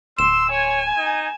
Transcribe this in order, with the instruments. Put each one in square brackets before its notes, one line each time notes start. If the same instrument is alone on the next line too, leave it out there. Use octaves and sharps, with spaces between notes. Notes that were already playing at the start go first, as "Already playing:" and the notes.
[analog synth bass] D1 [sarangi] C6 [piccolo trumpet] E6 [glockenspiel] E7
[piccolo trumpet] C#5 [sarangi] G#5
[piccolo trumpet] D#4